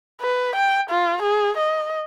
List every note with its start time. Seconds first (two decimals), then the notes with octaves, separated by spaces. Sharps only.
0.21 B4
0.56 G5
0.90 F4
1.22 G#4
1.57 D#5